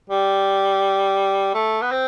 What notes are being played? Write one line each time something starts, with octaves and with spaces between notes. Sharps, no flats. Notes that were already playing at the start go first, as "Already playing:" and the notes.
G3
A3
B3
C4